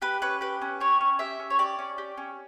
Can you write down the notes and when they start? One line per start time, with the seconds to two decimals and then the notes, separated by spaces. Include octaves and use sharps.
0.02 G4 B4
0.22 C#4 B4
0.41 G4 B4
0.61 C#4
0.80 G4 C#5
1.01 C#4
1.19 G4 E5
1.39 C#4
1.50 C#5
1.58 G4 D5
1.79 C#4
1.98 G4
2.18 C#4